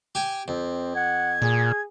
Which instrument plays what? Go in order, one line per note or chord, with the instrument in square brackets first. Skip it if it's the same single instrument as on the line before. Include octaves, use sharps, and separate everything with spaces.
[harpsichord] G4 G5 G#5
[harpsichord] F2 [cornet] C4
[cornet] F#5 [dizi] G#6
[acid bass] A#2 [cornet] G#4